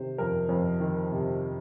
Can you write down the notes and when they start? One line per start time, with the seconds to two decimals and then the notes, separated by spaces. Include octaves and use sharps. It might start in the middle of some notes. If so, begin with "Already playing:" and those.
Already playing: C3 D#3 C5
0.18 F2 A#4
0.49 F2
0.80 D#3
1.12 C3